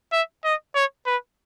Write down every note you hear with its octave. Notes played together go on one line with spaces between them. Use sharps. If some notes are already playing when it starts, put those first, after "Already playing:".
E5
D#5
C#5
B4